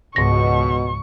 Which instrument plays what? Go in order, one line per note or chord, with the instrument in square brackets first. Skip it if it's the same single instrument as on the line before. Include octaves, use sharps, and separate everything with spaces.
[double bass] C#2 [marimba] G#2 A#6 [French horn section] B2 [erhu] C#6